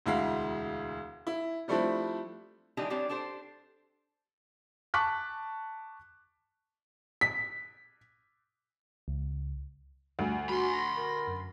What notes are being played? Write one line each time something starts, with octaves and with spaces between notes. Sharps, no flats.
E1 D2 G#3 E4 F5
E4
F3 G3 A3 C4 D4 E4
D3 E3 G#3 D4 D#4 G4
G3 C4 D4 G4 C#5 D5
D4 G4 A4 C5
A5 C#6 D6 F#6 B6
B6
C#2
D2 G3 G#5
F#4 B5 C6
A#6
A#4
F#2